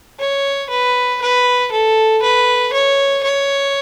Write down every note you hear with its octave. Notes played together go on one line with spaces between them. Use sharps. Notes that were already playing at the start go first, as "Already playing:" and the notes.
C#5
B4
B4
A4
B4
C#5
C#5